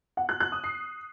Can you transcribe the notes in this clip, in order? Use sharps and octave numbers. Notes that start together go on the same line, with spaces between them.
F#5
F#6
F#6
D#6
C7